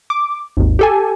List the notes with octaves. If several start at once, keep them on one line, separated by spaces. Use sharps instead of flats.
D6
G#1 D#2
G4 A4 G#5